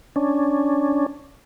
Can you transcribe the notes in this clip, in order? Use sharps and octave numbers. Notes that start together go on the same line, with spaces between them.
C#4 D4